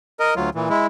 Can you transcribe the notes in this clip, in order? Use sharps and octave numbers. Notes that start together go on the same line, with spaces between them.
A#4 D#5
D2 F#3 F4
A#2 E3
G#3 E4